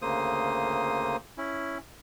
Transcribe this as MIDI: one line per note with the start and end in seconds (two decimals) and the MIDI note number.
0.02 1.17 38
0.02 1.17 49
0.02 1.17 58
0.02 1.17 72
0.02 1.17 87
1.38 1.78 61
1.38 1.78 64